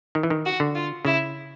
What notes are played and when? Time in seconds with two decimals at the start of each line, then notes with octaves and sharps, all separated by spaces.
0.15 D#3
0.23 E3
0.30 D#3
0.46 F#4
0.60 D3
0.75 F4
1.05 C#3 E4